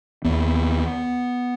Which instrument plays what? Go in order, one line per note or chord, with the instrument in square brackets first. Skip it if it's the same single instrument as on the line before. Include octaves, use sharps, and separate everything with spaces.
[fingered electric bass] D#2 B3